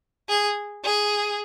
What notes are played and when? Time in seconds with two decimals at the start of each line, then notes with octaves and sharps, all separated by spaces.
0.29 G#4
0.84 G#4